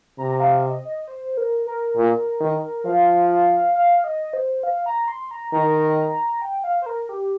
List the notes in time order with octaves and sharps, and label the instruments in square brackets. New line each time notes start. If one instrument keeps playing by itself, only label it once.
[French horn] C3 [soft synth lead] A#5
[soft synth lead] F5
D#5
D#5
C5
A#4
A#4
[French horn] A#2
D#3
[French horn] F3 [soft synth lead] F5
[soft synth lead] F5
D#5
C5
F5
A#5
C6
A#5
[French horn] D#3 [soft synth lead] A#5
[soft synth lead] G5
F5
C5
A#4
G4